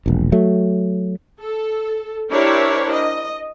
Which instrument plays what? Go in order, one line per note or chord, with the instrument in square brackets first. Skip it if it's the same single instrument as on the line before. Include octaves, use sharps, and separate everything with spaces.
[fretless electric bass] E1 A#1
F#3 A3
[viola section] A4
D4 E4 G4 A#4 C5 C#5
D#5